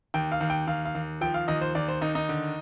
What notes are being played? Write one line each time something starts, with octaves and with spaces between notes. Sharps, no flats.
D#2 G5
F5
D#2
G5
D#2 F5
F5
D#2
F3 G5
F5
D#2 D#5
C5
D#2 D5
C5
D#2 D#4
D#4
D3